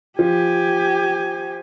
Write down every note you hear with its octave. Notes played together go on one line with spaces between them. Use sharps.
F3 G4 G#5